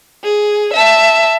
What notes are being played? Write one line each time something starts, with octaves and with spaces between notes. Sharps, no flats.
G#4
E5 A5